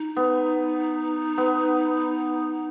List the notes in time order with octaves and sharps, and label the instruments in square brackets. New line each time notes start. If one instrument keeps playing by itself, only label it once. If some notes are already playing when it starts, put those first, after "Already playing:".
Already playing: [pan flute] D#4
[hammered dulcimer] B3
B3